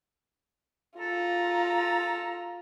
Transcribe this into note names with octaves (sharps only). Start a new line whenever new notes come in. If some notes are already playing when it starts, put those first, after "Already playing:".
F4 A4 A#5